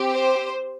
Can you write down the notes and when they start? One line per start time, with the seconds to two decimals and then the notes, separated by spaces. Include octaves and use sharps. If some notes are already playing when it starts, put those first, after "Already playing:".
Already playing: C4 G4
0.10 C5